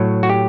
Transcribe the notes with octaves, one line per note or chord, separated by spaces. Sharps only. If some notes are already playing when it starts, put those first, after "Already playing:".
Already playing: A2 F#3
F#4
G4